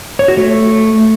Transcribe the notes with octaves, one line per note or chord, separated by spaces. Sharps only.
C#5
F#4
A3